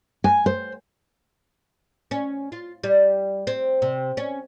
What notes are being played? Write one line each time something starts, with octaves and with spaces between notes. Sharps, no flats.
G#5
C5
C#4
F4
G3
C4
C3
C#4